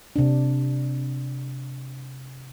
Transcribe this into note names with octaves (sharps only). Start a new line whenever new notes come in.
C3 D4